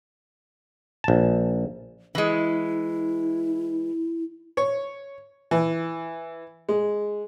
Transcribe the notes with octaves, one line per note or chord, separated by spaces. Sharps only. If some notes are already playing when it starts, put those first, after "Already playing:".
A#1 A5
E3 G#3 E4
C#5
E3
G#3